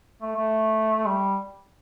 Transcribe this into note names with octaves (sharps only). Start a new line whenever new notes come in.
A3
A3
G3